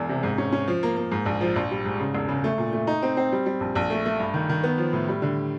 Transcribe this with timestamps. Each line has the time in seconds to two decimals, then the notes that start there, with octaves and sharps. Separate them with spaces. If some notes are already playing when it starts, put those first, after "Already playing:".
Already playing: E1 E2
0.09 C3
0.23 G#2
0.38 C#4
0.52 C#4
0.68 F3
0.83 A#3
0.97 A#3
1.12 G#2
1.26 A#1
1.41 F3
1.56 A#1
1.71 G3
1.85 G#2
2.00 C#3
2.14 E1
2.29 C#3
2.44 A3
2.58 A#2
2.73 A3
2.87 D#4
3.03 C4
3.17 C4
3.32 G3
3.46 G3
3.60 A#1
3.75 A#1
3.90 A3
4.05 A3
4.19 G2
4.34 D#3
4.49 D#3
4.63 B3
4.78 F3
4.93 A2
5.08 G3
5.22 D3